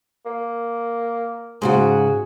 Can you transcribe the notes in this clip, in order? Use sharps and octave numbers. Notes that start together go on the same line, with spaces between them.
A#3
G#2 C#3 F#4 G#4